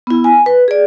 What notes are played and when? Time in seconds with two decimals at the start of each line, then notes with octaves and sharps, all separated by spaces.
0.07 B3 E4
0.24 G#5
0.46 B4
0.68 G#4 D5